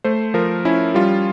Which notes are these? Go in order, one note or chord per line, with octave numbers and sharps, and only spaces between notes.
A3 C5
F3 A#4
C#4 E4
G3 F4